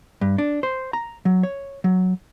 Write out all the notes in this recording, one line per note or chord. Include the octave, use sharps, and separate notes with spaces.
G2
D4
C5
A#5
F#3
C#5
F#3